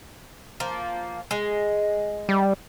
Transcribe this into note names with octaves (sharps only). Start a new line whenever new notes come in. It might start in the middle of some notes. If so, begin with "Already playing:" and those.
F3 A#3
G#3
G3